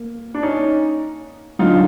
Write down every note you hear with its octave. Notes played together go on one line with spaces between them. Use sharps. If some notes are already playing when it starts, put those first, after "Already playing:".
Already playing: A#3
D4
C#4 D#4
D3 F#3 D#4 F4